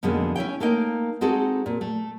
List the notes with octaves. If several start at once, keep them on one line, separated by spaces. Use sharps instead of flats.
F2 B2 D3 G#3 A#3 C#4
C#4 E4 C#5 G5
A3 A#3 D#4 G5
G#3 C4 D#4 F#4 G#4 A4
A#2
A3